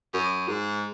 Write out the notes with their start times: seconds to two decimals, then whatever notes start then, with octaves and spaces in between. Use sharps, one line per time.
0.14 F#2
0.48 G#2